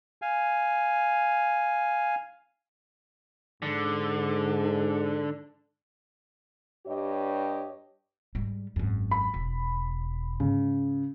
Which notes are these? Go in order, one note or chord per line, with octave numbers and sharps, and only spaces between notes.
F5 G#5
G#2 D3
G2 G4 C#5 D#5
G#2 G3
G#1 F#2
B5
E1
G#2 C#3